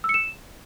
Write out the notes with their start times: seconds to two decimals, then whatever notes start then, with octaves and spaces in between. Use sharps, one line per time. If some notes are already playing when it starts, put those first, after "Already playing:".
0.04 E6
0.09 C#7
0.14 E7